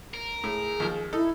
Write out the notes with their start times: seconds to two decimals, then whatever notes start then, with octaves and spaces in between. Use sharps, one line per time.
0.14 A#4
0.44 A2 G#4
0.80 D#2 F3
1.13 D#4 E4 A4